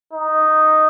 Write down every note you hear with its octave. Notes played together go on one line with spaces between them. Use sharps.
D#4